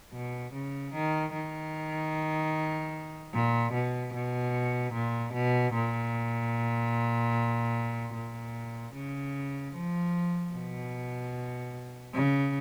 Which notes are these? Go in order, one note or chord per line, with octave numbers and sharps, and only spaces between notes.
B2
C#3
D#3
D#3
A#2
B2
B2
A#2
B2
A#2
A#2
C#3
F3
B2
C#3